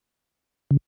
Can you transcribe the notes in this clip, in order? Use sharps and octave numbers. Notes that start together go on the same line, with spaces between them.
C#3